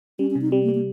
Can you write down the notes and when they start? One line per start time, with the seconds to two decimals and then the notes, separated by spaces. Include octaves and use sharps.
0.19 G3 C#4
0.30 C#4
0.36 C3
0.42 D#4
0.52 G3 C4
0.63 A#3
0.69 G3
0.74 A#3